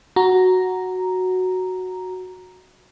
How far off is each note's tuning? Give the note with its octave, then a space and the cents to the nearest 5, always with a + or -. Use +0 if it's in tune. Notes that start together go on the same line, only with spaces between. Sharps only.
F#4 +0 A#5 +0